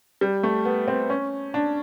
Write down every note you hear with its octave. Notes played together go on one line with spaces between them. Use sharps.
G3
A3
B3
C4
C#4
D4